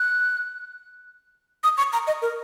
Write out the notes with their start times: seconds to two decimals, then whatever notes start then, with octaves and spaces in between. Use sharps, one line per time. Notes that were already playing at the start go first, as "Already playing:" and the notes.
Already playing: F#6
1.64 D#6
1.78 C#6
1.93 A#5
2.07 D#5
2.22 A#4